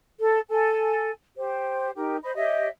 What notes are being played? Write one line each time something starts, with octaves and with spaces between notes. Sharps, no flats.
A4
A4 G#5
G4 C5
D#4 G4 A#4
C5 D#5 B5
G4 C#5 D#5 E5